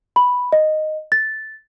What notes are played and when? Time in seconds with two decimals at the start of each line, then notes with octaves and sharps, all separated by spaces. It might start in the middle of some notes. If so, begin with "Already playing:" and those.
0.16 B5
0.52 D#5
1.12 A6